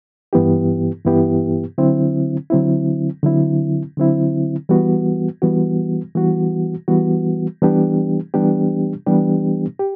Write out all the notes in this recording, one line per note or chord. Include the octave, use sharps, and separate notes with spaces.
G2 E3 B3 E4 G4
G2 E3 B3 E4 G4
D3 F#3 C4 E4
D3 F#3 C4 E4
D3 F#3 C4 E4
D3 F#3 C4 E4
E3 G3 B3 F#4
E3 G3 B3 F#4
E3 G3 B3 F#4
E3 G3 B3 F#4
E3 G3 B3 D4 G4
E3 G3 B3 D4 G4
E3 G3 B3 D4 G4
G4